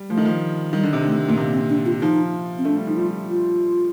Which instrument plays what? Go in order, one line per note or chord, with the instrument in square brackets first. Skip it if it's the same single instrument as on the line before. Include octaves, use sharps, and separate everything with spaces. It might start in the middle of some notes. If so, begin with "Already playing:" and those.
Already playing: [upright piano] G3
[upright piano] F3 [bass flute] A3
[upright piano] D#3
F3
[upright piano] D#3 [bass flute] G3
[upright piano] D3
C3
[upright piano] D3 [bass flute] A3
[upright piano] A#2 [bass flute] A3
[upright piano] C3 [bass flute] A#3
[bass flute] C4
D4
F4
[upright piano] F3 [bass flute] D#4
[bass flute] C4
[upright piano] A3 [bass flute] D4
[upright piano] G3
[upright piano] F3 [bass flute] D#4
[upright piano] G3 [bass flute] F4
[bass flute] F4